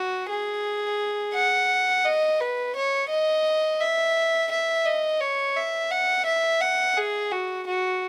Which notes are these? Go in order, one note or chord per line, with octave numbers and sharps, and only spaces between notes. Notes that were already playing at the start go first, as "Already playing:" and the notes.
Already playing: F#4
G#4
F#5
D#5
B4
C#5
D#5
E5
E5
D#5
C#5
E5
F#5
E5
F#5
G#4
F#4
F#4